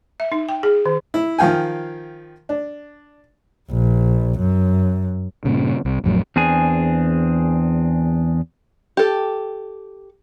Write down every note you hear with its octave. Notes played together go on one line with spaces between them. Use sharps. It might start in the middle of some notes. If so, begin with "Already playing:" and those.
E5
D#4
G5
G#4
D#3
E4
D#3 F3 F5 G5 G#5
D4
A#1
F#2
G2 A#2 C#3
C2
A1 F2 A2 F#3
E2 C4 D4 G#4 G#5
G4 A4